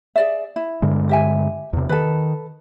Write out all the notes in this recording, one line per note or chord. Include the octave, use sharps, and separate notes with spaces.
G#4 D5 E5
E4
G2 D3 G#3
G4 E5 G#5
E2 C3
D#3 A4 B4